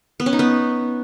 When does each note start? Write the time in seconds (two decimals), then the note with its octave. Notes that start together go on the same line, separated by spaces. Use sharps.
0.20 B3
0.26 C#4
0.33 D#4
0.39 B3